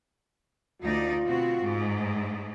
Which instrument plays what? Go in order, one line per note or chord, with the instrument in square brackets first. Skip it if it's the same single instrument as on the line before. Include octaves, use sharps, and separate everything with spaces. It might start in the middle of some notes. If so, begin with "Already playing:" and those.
[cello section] D2 D#4 D5 [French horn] F4
[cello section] B2 C4 F#4
G#2